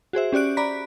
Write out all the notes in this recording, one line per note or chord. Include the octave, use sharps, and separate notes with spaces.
F#4 G#4 C5 E5
C#4 G4 D5 F#6 D7
D5 A#5 B5 B6